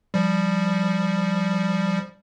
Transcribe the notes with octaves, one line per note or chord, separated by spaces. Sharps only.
F3 G3